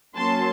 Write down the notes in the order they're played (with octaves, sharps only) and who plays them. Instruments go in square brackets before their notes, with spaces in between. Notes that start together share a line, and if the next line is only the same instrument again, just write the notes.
[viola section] F#3 A#3 C#4 A5 C6